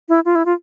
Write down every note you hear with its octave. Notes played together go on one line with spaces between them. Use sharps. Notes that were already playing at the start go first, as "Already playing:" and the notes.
E4
F4
E4
F4